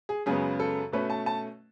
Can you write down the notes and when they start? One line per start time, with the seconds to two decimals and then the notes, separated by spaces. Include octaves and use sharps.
0.09 G#4
0.26 F#2 C#3 G#3 B3 G#4
0.60 A4
0.92 B2 A3 C#4 B4
1.10 A5
1.26 A5